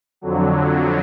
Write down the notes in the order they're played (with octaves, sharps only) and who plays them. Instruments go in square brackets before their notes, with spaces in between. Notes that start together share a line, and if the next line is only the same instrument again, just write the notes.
[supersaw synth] F2 D3 F#3